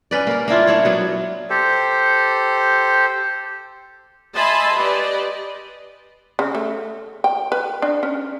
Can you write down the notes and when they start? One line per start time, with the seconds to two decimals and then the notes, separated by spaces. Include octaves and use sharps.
0.11 C#4 B4 D5
0.27 A#3 A#4
0.48 A#3 D4 E4 F4
0.67 D4 E4 C#5
0.85 F#3 B3
1.50 G4 A4 C5
4.35 D#5 E5 G#5 A5 B5 C6
4.74 G4 B4 D5 D#5
6.39 C#3
6.55 A3
7.24 G5
7.52 B4
7.82 D4
8.03 C#4